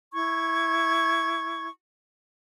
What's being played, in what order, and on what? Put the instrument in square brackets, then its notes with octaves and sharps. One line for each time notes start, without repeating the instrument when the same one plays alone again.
[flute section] E4 C#6 G#6